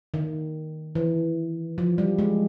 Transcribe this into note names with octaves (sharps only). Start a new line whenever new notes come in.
D#3
E3
F3
G3
G#3